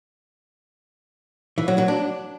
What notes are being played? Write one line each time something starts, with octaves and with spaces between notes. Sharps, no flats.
E3
F#3
F#3
D4